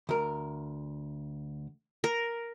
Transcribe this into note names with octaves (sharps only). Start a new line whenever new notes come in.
D2 A#4
A#4